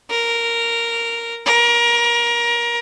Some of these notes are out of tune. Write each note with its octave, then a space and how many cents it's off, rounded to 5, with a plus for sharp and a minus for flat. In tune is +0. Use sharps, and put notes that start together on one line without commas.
A#4 -5
A#4 +25